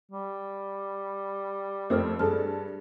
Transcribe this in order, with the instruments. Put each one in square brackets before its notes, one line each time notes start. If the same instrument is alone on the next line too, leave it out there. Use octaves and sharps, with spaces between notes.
[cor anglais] G3
[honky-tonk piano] F2 A3 C4 [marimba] A#4 C5 F6
[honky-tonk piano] G2 A5 [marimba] G#4 A4 F6